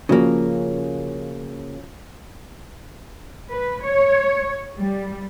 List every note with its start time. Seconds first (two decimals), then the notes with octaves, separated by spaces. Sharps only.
0.09 C#3 F3 A#3 C#4 F#4
3.51 B4
3.84 C#5
4.80 G3